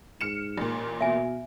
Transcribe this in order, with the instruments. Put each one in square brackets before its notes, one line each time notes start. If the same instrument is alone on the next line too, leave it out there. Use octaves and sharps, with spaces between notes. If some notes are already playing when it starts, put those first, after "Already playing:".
[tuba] G#2 [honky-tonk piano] F6 C#7 E7
[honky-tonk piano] A1 A#2
[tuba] B2 [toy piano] E5 G#5